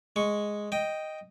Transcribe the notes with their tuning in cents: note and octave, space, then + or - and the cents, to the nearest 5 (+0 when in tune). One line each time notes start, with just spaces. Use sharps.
G#3 +0 C#6 +0
D#5 +0 G5 +0